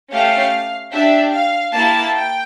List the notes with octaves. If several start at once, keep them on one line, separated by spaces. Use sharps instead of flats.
A3 C#4 G4 F5
D4 G4 E5
F5
A#3 E4 G4 A5
G5